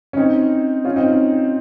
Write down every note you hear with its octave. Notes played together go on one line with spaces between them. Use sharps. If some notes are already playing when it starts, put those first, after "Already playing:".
C#4
C4 D#4
C#4 F4
C4 D#4